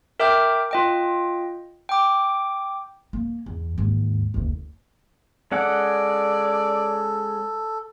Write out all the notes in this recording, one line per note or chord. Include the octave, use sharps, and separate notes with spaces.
A#4 E5 G5 D6 F6 G6
F4 D#5 G5
G5 D6
A#3
E2
D#2 G#2
F#1 D2
G#3 C#4 A4 D5 F#5